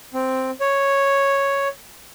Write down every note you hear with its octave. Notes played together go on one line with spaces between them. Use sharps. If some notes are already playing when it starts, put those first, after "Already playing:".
C4
C#5